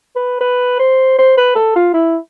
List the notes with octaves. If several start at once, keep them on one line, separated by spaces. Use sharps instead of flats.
B4
B4
C5
C5
B4
A4
F4
E4